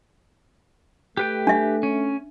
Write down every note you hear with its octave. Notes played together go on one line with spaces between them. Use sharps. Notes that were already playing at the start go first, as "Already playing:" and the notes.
A3 G4 B4 G5
D4 E5
C#4